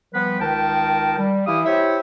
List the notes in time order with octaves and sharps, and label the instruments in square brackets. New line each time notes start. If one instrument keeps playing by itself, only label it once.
[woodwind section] F3 G3 B3 B4
C#2 D#3 D#4 A#4 G5 A5
G3
E3 E4 G4 F5 D#6
E4 G4 C5 C#5 E5